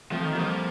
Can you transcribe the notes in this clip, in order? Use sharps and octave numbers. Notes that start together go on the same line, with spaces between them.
F3 A3 C4
D#3
F3 G3 A#3